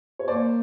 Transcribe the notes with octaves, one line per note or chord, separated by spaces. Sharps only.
C#5
A#3 C5 D5